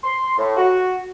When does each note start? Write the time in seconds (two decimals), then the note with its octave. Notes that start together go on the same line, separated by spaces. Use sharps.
0.03 C6
0.38 A2
0.57 F#4